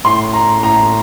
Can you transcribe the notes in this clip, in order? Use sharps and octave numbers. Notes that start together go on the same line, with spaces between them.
A2 C6
A#5
A2 A#5